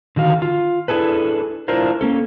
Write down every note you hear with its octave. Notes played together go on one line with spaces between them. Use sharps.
D3 D#3 F#4 F5
F4
D4 E4 G#4 A4 B4
D4 E4 F4 A#4 C5
A#3 C#4 A4